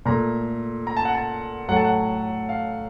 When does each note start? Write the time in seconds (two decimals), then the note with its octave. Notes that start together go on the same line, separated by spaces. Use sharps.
0.05 A#2 A3 A#5
0.87 A#5
0.97 A5
1.05 F#5
1.15 A5
1.68 A2 F#3 A3 F#5
1.76 A5
1.84 F#5
2.49 F5